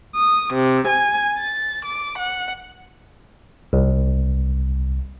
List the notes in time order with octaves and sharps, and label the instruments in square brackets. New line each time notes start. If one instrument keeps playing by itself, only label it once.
[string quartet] D#6
C3
G#5
A6
D6
F#5
[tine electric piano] C2